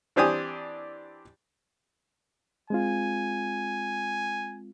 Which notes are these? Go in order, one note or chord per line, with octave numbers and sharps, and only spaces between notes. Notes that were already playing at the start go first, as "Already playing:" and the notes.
E3 C4 D4 G4 G#5 D#6
G#3 C4 F4 G#5